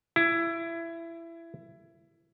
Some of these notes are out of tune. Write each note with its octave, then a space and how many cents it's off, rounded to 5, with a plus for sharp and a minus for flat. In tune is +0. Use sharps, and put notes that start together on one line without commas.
E4 +20